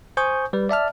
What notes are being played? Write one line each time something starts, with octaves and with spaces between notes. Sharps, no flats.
C5 G#5 C#6 D#6 G6
G3 B4
D5 E5 A5 F6